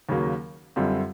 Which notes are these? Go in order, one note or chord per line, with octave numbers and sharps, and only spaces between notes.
D#2 C#3 F#3 A#3
F#2 D3 G3 C4 F4